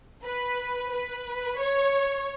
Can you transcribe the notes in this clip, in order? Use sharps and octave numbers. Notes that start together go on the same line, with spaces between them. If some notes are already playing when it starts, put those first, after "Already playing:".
B4
B4
C#5